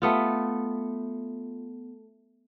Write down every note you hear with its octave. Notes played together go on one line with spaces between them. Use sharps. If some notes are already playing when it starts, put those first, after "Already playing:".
A3 B3 F4